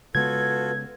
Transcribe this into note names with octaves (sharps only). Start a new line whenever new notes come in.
C#3 G#3 B3 F4 F#4 A4 B4 G#6